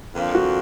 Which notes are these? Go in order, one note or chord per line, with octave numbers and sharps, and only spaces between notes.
F2 D3 F3 A#3 D4
F#4